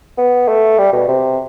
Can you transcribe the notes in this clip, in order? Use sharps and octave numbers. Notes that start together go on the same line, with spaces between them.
B3
A3
G3
B2
C3